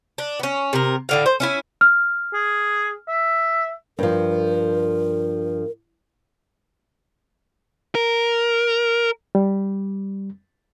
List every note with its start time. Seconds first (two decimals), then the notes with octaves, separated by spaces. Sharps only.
0.18 D4
0.39 B3 C#4
0.73 C3 A#4
1.09 A2 D3 F5
1.26 C5
1.40 C#4 E4 G#5
1.81 F6
2.34 G#4
3.08 E5
3.99 G2 F3 A#4
7.95 A#4
9.35 G3